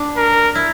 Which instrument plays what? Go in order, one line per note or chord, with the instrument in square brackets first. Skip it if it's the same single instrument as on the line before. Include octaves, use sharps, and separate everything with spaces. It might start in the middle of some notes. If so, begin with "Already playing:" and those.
Already playing: [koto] D4
[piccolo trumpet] A#4
[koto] E4